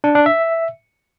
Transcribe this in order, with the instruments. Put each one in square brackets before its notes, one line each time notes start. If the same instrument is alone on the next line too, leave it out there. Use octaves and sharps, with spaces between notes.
[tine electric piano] D4
D4
E5